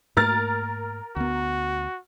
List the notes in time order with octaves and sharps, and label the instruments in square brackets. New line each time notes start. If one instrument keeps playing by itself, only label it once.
[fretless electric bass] G#2 A3 A#3 [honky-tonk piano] A#4 F6 A6
[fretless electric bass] D2 B3 [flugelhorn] F#4